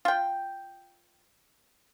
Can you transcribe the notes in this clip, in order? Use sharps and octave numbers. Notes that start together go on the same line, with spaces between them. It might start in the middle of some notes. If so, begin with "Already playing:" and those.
F4 G5